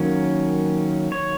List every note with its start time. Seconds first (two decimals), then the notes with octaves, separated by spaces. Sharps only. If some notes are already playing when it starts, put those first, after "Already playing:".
Already playing: D#3 F#3 A#3 C#4
1.12 C#5